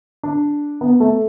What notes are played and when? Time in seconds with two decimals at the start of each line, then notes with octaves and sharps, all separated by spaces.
0.23 D4
0.81 B3
1.00 A3